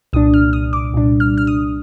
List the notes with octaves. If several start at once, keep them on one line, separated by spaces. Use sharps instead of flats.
C2 A#2 G3 D4 D#6
F6
D#6
D6
C2 A#2 G3 D4
F6
F6
D#6